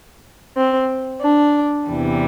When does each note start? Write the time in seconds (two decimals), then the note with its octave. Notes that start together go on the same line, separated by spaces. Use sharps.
0.57 C4
1.22 D4
1.89 E2 C3 E3 G3